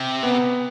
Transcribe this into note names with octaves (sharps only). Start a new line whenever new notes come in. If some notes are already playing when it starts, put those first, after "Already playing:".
Already playing: C3
B3